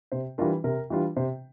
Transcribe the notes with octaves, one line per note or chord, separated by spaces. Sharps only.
C3 C5
E3 G3 D4 F4 A#4
C3 A#4
E3 G3 D4 F4
C3 C5